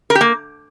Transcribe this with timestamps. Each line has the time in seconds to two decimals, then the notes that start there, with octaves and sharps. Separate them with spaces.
0.10 A#4
0.15 G4
0.21 A#3